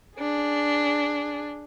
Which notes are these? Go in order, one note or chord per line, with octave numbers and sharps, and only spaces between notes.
D4 G#4